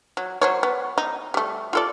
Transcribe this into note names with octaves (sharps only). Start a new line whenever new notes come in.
F#3
F#3 C5 C#5
B3
D#4
G3 A3
F4 A4 D5